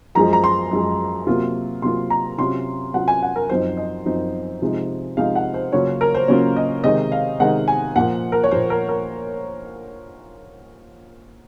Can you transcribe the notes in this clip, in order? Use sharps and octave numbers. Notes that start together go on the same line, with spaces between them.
F#2 F3 G#3 A#5
A#5
C6
F#2 F3 G#3
C3 F#3 A#3 F4
C3 F#3 A#3 F4 C6
A#5
C3 F#3 C#4 F4 C6
C3 F#3 C#4 F4 F#5
G#5
F#5
A#4
F#2 F3 C4 D#4 C5
D#5
F#2 F3 C4 D#4
C3 F3 G#3 D#4
C3 F3 G#3 D#4 F5
F#5
C5
C#3 F#3 A#3 C#4 F4 C#5
A#4
C5
C#3 F#3 A#3 C#4 F4 C#5
D#5
C3 D#3 G#3 D#4 D#5
F5
C3 D#3 G#3 D#4 F#5
G#5
A#2 F3 A#3 F#5
A#4
C#5
A#2 F3 A#3 C5
A#4
A#4